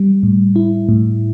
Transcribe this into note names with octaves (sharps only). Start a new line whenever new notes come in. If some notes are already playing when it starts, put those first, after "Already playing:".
Already playing: G3
A2
E4
A2